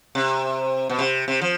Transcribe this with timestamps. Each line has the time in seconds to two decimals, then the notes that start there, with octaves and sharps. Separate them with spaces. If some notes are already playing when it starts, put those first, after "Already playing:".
0.15 C3
0.89 B2
0.99 C3
1.28 C3
1.41 F3